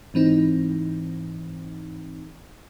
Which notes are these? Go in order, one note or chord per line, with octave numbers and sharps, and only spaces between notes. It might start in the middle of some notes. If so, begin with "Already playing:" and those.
G#2 E3 C4 D#4